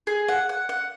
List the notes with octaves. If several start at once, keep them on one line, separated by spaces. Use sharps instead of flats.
G#4
F#5
F#5
F#5